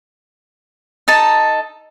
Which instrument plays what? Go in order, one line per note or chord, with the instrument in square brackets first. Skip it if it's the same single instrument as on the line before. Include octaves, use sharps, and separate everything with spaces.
[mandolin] D#4 A4 A5